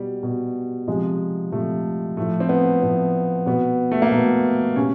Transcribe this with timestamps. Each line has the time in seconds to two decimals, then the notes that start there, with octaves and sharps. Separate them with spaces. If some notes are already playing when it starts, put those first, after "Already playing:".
Already playing: B2 G3
0.23 B2
0.88 C3 F3 G#3
1.52 C3 F3 A3
2.17 A2 F3 A3
2.40 C4
2.49 B3
2.82 A2 F3 C4
3.46 B2 B3
3.91 A3
4.02 A#3
4.12 B2 B3
4.76 C3 C#4